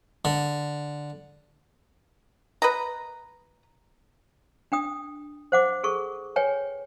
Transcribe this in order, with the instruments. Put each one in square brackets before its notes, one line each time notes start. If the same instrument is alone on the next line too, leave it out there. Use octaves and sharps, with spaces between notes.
[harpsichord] D3
[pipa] B4 D#5 A#5
[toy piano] D4 G5 D#6
C5 F#5 D6
G#4 A4 C#6
B4 C#5 G5 G#5